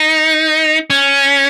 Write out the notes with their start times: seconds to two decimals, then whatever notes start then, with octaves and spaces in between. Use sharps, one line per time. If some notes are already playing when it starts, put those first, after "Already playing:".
Already playing: D#4
0.90 C#4